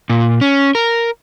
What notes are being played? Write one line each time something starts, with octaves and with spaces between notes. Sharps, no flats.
A#2
C#4
A#4